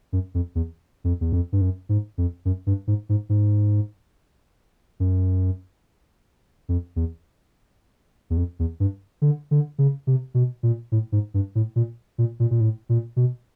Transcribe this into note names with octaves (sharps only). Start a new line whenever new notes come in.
F#2
F2
E2
F2
E2
F2
G2
F#2
G#2
F2
F#2
G2
G#2
G#2
G#2
F#2
F2
E2
E2
F2
E2
G2
D3
D3
C#3
C3
B2
A#2
A2
G#2
G2
A2
A#2
A#2
A#2
A#2
A2
A#2
B2